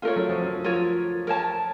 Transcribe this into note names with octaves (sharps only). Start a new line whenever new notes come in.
A3 F4 A#4 C#5
F#3
F3
F#3
F4 A#4 C#5
A#4 C#5 A5